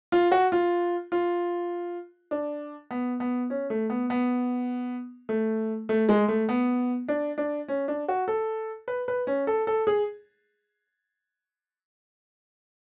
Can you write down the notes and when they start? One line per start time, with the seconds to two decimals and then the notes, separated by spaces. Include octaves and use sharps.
0.12 F4
0.32 F#4
0.52 F4
1.12 F4
2.31 D4
2.91 B3
3.20 B3
3.50 C#4
3.70 A3
3.90 B3
4.10 B3
5.29 A3
5.89 A3
6.09 G#3
6.28 A3
6.49 B3
7.08 D4
7.38 D4
7.68 C#4
7.88 D4
8.08 F#4
8.28 A4
8.88 B4
9.08 B4
9.27 C#4
9.47 A4
9.67 A4
9.87 G#4